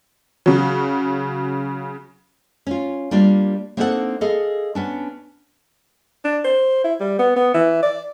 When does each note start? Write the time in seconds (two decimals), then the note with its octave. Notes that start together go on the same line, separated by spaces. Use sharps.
0.46 C#3 F#3
2.67 C#4 F4
3.11 G3 A#3 D4 F4
3.77 A#3 C4 D4 D#4 A4 F#5
4.21 G#4 A4 D#5 F5
4.75 B3 C#4 D4
6.25 D4
6.44 C5
6.84 E4
7.00 G3
7.19 B3
7.36 B3
7.54 E3
7.82 D5